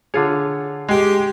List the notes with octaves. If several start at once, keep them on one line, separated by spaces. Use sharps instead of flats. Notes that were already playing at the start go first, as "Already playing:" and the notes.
D3 F4 G#4 C#5
G#3 G4